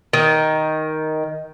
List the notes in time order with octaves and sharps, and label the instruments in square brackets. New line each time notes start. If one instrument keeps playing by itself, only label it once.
[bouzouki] D#3